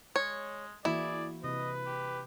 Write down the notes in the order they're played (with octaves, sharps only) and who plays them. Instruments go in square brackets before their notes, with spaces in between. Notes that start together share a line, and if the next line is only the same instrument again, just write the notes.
[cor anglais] G#3 [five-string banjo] C#5
[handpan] E3 A#3 F#4 [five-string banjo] E4 [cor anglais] G#4 [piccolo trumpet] D5
[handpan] C3 [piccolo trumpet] B4 [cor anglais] D#5
[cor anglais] G4